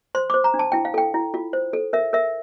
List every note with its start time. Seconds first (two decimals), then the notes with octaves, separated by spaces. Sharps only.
0.15 C5 C6
0.30 C5 D6
0.44 A#5
0.54 D4
0.59 A5
0.72 E4 G5
0.85 F5
0.94 A4 G5
1.14 E4
1.34 F4
1.53 C5
1.73 A4
1.93 A#4 E5
2.13 A#4 E5